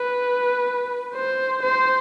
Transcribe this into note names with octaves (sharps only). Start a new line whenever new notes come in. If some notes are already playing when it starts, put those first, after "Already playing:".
Already playing: B4
C5
C5